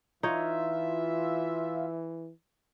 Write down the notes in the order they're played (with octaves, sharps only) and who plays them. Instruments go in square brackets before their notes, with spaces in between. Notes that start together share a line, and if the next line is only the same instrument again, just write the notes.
[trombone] E3 [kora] D#4 C#5 [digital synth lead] F4 [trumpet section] E5